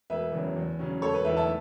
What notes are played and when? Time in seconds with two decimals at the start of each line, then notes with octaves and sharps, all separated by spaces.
0.10 E1 B4 E5
0.32 E2 C#3 F#3
0.56 E2
0.79 C#3 F#3 C#4
1.02 E1 A4 C#5
1.14 B4
1.25 E2 E3 B4 E5
1.37 E5 A5